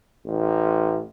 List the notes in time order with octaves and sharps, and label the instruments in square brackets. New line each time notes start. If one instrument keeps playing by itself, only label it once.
[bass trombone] A1